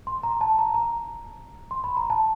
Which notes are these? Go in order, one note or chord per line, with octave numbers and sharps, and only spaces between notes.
C6
A#5
A5
A#5
A#5
C6
B5
A#5
A5